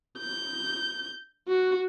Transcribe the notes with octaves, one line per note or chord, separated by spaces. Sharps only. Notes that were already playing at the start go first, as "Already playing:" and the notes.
G6
F#4